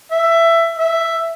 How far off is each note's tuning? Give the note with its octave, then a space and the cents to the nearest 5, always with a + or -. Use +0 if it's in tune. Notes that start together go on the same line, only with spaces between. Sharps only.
E5 +15
E5 +5